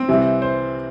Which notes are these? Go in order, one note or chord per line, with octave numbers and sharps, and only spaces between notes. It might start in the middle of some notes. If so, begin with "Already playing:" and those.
Already playing: C4
C2 C3 E3
C5